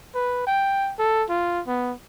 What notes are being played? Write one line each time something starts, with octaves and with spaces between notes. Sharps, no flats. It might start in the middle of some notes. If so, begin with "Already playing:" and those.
B4
G5
A4
F4
B3